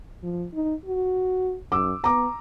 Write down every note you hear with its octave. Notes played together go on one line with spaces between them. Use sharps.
F3
D#4
F#4
F#2 D6 E6
B3 A#5 D6